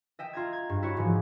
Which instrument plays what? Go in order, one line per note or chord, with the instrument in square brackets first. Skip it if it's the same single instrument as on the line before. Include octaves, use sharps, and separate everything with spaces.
[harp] D#5 E5 G5
F4 A#5 G#6
G#6
G2
E4 F#4 C#5
G#2 E3 F3